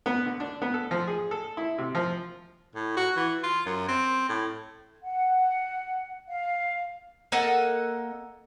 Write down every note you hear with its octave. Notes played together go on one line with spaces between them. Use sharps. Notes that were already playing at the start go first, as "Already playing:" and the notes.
B3
D3
D4
B3
A4
F3
G#4
A4
E4
C3
F3
A2
F#4
E3
F4
F#2
C4
A2
F#5
F5
A#3 A4 D#5 F#5